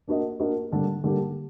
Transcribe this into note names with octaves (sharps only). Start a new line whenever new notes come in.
A#3 D4 F#4 A#4 D#5
A#3 D4 F#4 A#4 D#5
D3 G3 A#3 D4 G4
D3 G3 A#3 D4 G4